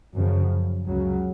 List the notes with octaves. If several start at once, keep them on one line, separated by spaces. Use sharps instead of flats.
F#2 C#3 F3
C#2 C#3 F#3